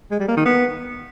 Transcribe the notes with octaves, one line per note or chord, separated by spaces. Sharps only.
G#3
G3
A#3
D#3
B3